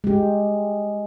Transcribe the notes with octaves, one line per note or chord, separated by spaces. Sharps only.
G#3 G4